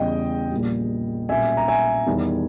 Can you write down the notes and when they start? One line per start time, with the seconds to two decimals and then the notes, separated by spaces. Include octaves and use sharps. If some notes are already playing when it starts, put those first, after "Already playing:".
Already playing: E2 C#3 G3 D#5 G5
0.51 A#1 A#2 G3
1.29 B1 A#2 G3 C#4 E5 G#5
1.57 A#5
1.68 E5 G#5
2.07 E2 D#3 G3